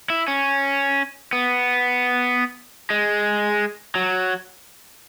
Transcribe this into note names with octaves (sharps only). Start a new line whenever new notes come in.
E4
C#4
B3
G#3
F#3